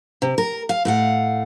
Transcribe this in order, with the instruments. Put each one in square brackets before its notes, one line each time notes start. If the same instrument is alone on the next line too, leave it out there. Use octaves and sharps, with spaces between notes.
[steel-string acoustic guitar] C3
A#4
F5
A2 F5 F#5